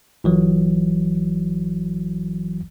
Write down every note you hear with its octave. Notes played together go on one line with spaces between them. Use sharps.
G1 E3 F#3